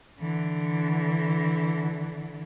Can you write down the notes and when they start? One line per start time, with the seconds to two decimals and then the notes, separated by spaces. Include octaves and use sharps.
0.20 D3 E3